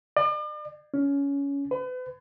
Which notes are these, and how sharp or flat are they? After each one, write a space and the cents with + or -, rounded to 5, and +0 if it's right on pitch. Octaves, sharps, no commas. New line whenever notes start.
D5 +40
C#4 +20
B4 +40